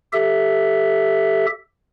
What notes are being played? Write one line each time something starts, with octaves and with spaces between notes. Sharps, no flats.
G4 A4 E5